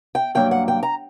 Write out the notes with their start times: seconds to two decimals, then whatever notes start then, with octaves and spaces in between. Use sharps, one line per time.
0.15 G5
0.35 G2 F#3 A#3 G5
0.51 F#5
0.68 G5
0.83 A#5